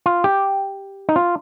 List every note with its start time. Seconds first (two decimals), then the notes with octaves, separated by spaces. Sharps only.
0.06 F4
0.24 G4
1.09 D#4
1.16 F4